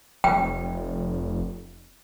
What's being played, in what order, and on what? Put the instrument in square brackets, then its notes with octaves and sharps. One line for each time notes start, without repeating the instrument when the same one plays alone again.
[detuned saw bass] F1 [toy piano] G5